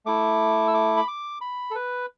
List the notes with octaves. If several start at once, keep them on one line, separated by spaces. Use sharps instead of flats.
A3 E4 D6
E6
D6
B5
D6
B5
A4
B4